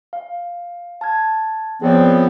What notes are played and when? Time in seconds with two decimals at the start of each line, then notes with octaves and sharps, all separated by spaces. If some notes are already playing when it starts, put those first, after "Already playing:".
0.13 F5
1.01 A5 F6 G#6
1.82 F3 B3 C4 G#4 C#5 D5